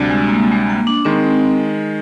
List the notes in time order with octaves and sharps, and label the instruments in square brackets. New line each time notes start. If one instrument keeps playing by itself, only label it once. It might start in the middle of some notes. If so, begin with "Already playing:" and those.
Already playing: [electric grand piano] D2 C3 G3 D4
[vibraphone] G#3
A#3
G#3
G#3
A#3
D4
[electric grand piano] D#3 G#3 [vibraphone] C4